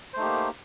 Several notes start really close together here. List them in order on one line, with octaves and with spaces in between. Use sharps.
C5 A3 D#4 G4 A#3